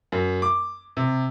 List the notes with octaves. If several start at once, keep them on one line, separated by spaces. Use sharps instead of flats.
F#2
D6
C3